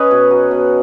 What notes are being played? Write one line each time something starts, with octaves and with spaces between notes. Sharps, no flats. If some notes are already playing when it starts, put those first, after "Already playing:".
Already playing: C#4 G#4 B4 C#5 D#5
B2
F#3
B2